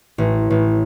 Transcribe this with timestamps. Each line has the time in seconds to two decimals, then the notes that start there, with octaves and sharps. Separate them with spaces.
0.18 A1
0.50 A1